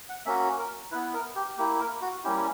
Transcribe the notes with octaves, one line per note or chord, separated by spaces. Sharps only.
F#5
A#3 C#4 F#4 E5
A#4
B3 E4 B4
A#4
G4
A#3 E4 G4
A#4
F#4
G3 A#3 C#4 E4 G4